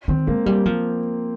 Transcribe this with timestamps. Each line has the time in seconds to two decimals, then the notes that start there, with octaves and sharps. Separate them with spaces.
0.08 D#3 C4
0.27 G#3 A#3
0.46 G3 A#3
0.66 F3